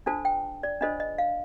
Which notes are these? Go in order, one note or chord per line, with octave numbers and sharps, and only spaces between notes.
D4 F4 A4 C5 A5
G5
D5
D4 F4 A4 C5 D#5
D#5
F5